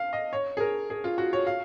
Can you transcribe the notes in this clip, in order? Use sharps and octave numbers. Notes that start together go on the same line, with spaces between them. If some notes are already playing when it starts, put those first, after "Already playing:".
Already playing: F5
D#5
C#5
G#4
A#4
G#4
F4
F#4
C#5
F5